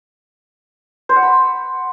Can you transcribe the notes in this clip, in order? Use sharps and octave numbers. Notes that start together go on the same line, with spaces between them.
C5
F#5
B5